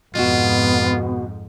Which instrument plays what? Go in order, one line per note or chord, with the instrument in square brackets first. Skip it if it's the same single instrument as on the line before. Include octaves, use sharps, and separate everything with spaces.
[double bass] F2 G#2 [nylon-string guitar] B2 F#4 [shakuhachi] B3 [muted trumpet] F4